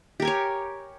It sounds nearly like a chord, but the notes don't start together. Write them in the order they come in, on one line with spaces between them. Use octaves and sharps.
G4 A#4 G#5 C#5